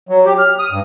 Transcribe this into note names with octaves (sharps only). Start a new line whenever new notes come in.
F#3
G4
F6
D#6
G2